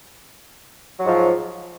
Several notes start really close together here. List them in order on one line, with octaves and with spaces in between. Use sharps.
F#3 G#2 F3